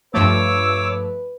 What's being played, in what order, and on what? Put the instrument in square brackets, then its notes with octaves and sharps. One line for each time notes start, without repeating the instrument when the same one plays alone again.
[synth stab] G2 F3 A3 [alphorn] B4 [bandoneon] C#5 D6 [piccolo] E6